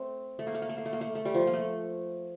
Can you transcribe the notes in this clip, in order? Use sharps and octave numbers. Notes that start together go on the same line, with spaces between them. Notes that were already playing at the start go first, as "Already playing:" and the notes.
Already playing: A3 C4
A3
A#3
A3
A#3
A3
A#3
A3
A#3
A3
A3
G3
F3
A#3
A3